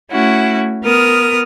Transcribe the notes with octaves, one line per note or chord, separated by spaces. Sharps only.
A3 C#4 E4 F#4
B3 A#4 D#6 F6